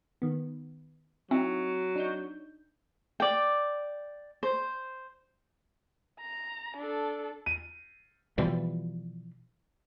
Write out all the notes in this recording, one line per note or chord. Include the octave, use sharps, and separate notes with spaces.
D#3 B3
F#3 C4 D#4 E4
D4 D#4 G6
D5 G5
C5
A#5
D4 A4
D#7
B2 E3 F3 G3